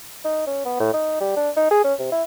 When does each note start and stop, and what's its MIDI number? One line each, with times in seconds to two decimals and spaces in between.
0.25 0.45 63
0.47 0.64 61
0.65 0.77 59
0.80 0.92 45
0.94 1.19 63
1.20 1.32 55
1.36 1.50 62
1.56 1.66 63
1.71 1.84 68
1.84 1.94 61
1.99 2.08 48
2.12 2.23 64